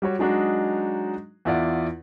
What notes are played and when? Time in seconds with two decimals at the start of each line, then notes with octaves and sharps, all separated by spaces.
0.02 G3 F#4 C#5
0.19 F#3 G#3 D4 D#4 F#4
1.45 E2 E4 F4 D5 F#5